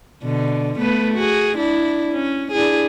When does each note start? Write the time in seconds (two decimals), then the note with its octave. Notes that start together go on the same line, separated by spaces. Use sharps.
0.23 B2 D3
0.79 A3 B3 B4
1.14 F#4 G#4
1.57 D4 E4
2.13 C#4
2.52 D4 E4 G#4